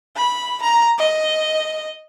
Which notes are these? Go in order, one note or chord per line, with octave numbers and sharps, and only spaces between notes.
B5
A#5
D#5